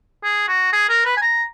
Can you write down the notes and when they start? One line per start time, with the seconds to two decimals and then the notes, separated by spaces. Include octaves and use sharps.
0.23 G#4
0.48 F#4
0.73 G#4
0.89 A#4
1.05 B4
1.17 G#5
1.22 A#5